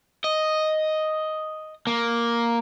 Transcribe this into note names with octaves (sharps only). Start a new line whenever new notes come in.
D#5
A#3